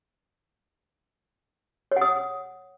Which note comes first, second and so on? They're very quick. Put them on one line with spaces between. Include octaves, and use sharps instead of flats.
C#5 F#5 D#6